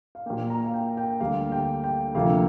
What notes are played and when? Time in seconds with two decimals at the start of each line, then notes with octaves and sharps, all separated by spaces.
0.15 F5
0.26 A#2 A#3 G5
0.50 A#5
0.66 F5
0.74 G5
0.97 G5
1.20 D2 D3 G3 A#3 F5
1.52 G5
1.84 G5
2.15 D2 C3 F3 A#3 F5